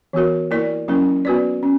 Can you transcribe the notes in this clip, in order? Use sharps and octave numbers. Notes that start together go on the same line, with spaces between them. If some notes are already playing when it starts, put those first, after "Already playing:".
E3 B3 F#4 A#4
A#3 E4 A#4 D5
F#3 A#3 C#4 E4 A#4
B3 F#4 B4 D5
C#4